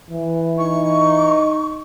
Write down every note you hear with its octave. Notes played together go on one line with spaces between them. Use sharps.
E3
D#4 C#6